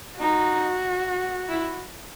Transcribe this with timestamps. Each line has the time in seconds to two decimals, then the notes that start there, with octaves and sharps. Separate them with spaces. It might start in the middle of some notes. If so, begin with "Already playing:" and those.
0.20 D#4 F#4
1.49 E4